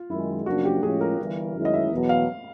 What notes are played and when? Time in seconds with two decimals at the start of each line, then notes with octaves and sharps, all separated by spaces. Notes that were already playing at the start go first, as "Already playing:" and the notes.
Already playing: F4
0.10 F#2 D#3 G#3 E4
0.46 F#2 C#3 F3 A#3 D4 F#4
0.65 G4
0.82 A2 F3 G#3 C#4 F4 G#4
1.01 A#4
1.19 G1 G2 E3
1.55 F#2 D#3 G#3 C#4 E4
1.65 D#5
1.74 E5
1.91 E2 B2 F#3
2.09 F5